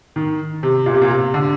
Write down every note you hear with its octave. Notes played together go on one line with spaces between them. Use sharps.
D#3
C3
A#2
C3
A#2
C3
D3